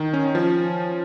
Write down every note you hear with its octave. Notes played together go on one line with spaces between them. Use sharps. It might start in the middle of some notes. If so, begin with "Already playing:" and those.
Already playing: D#3
C#4
F3